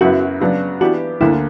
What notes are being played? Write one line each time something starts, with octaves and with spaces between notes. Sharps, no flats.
F#2 C#3 F#3 B3 E4 F#4
C#3 F#3 B3 D4
E3 B3 D4 F#4 G4
D2 D3 A#3 E4